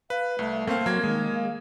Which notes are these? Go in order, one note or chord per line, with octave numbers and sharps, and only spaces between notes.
B4 F5
C2 A3
A3 A#3 C4 C5 F5
F#3 A#3 G#6
D#3 G#3
F5